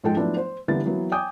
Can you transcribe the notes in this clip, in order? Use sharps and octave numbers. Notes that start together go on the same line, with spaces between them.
G#2 F3 G#3 A4 G5
F3 F#3 A3 B3 D4 E4
C5
D3 E3 G3 A#3 B3 A6
E3 F#3 A#3 B3
G5 G#5 D6 D#6 G6